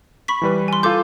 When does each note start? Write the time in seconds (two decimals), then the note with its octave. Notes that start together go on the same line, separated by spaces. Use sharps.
0.28 B5 C#6 B6
0.42 E3 G3 B4
0.68 G#5 C6
0.83 F4 A4 C6 D6 G6